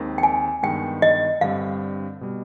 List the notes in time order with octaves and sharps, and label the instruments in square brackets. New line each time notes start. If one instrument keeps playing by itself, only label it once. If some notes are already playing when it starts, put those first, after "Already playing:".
Already playing: [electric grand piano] D#2 D#3 G#3 C4
[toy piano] G5
G#5
[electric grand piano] G2 D#3 G#3 B3 [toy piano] G5
[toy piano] D#5
[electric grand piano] G2 D3 G3 C4 [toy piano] F5
[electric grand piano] B2 G3